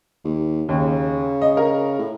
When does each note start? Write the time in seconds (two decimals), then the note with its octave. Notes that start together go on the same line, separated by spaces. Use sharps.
0.25 D#2
0.69 D#2 C#3
1.42 D#5
1.57 A#4
1.99 A2